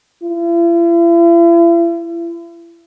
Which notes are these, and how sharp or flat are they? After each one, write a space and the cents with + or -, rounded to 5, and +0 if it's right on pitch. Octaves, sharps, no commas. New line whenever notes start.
E4 +45